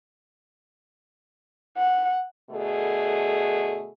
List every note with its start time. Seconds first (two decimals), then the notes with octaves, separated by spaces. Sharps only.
1.77 F#5
2.50 B2 D3 A3 G#4